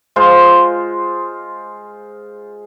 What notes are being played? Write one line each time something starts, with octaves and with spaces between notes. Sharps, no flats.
G#3 F4 C5